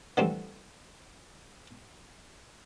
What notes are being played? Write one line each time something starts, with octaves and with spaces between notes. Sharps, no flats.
D3 E3 G3 A3 C4